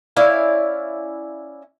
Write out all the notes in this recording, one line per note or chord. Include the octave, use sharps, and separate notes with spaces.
C#4 E4 D5 F5